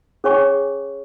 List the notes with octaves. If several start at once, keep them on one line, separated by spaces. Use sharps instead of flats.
C#4 G#4 C#5 G#5 C#6